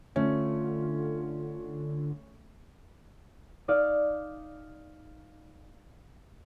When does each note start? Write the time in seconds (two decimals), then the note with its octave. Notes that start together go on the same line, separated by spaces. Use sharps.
0.16 D3 A3 C#4 F4
3.68 D#4 D5 F5